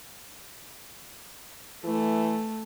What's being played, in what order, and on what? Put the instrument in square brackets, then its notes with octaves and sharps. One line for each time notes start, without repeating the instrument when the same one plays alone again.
[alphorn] E3 [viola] A3